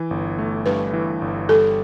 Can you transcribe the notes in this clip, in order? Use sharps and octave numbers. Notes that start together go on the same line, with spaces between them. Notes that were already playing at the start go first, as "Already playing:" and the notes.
Already playing: E3
G1
A3
G2 B4
E3
G1
G3 A4